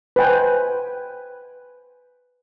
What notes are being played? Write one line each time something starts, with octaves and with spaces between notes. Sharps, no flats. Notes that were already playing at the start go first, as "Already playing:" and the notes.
B4 C5 D#5 G5 G#5 B5